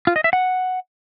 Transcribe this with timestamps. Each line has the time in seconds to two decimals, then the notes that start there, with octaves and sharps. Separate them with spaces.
0.07 F4
0.16 D#5
0.24 E5
0.33 F#5